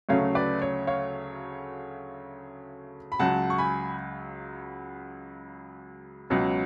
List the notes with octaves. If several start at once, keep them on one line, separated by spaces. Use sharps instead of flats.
D2 C#3 F#3 A3 C#4 C#5 F5
B4 D5
C#5
C#5 F5
B5
C#2 C#3 F#3 F#5 A5
C#6
G#5 B5
C#2 B2 F#3 C#4